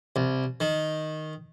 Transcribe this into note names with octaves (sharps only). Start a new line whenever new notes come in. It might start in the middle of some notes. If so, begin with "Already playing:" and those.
C2
D#3